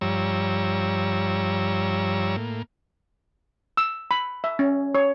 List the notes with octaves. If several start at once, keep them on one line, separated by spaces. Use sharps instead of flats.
G2 F3 G3 C#5 A#5 E6
A2 A#3
E6
B5
E5
C#4
C#5